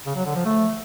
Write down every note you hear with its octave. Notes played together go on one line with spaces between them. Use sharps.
C#3
F#3
D3
F3
A3